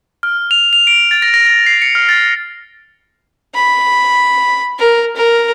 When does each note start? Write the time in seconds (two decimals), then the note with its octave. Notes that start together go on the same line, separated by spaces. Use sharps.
0.23 F6
0.51 F7
0.73 F7
0.87 D7
1.11 A6
1.22 A#6
1.34 A#6
1.47 A#6
1.66 C7
1.82 C#7
1.95 F6
2.09 A6
3.55 B5
4.79 A#4
5.17 A#4